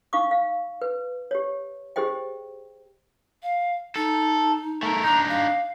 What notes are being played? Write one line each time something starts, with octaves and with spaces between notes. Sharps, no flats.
D#4 F5 C#6 D6
F5
B4
G4 C#5
G4 G#4 C5 D#5 G5
F5
D#4 A4
A3 A#4
D4 D#4 A#5
F5